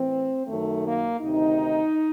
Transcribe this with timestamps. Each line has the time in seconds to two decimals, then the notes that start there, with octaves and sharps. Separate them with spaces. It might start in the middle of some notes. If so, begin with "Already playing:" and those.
Already playing: A2 E3 C4
0.47 F#2 D#3 F#3 A3
0.85 A#3
1.20 D2 C3 D#3 D#4